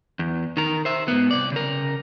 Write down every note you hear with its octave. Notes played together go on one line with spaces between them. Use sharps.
E2
D#3 A#4
C5 E5
G#2 B3
C2 D5
C#3 A#4